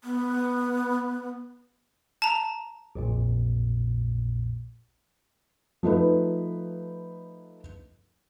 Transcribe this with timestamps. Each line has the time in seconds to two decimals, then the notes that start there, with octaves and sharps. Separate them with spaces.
0.04 B3
2.22 A5 A#5
2.95 A#1 F2 A#2
5.83 F3 A3 D#4 B4